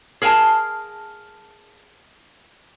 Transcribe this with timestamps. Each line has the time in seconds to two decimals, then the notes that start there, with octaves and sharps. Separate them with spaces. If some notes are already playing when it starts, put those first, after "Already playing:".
0.22 G#4 A#4 F5 G#5 A5